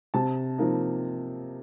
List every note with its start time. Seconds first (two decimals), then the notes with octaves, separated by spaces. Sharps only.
0.14 C3 A5
0.58 F3 A#3 D#4